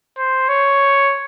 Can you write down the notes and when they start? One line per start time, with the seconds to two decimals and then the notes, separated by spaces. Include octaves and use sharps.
0.17 C5
0.49 C#5